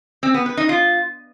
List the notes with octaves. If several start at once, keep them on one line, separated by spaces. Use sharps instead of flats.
C4
B3
B4
D#4
F4